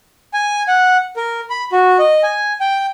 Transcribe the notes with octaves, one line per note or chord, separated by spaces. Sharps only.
G#5
F#5
A#4
B5
F#4
D#5
G#5
G5